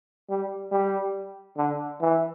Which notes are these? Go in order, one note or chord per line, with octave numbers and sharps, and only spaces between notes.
G3
G3
D3
E3